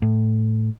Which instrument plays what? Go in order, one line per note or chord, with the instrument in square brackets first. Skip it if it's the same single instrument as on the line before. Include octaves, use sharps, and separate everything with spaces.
[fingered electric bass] A2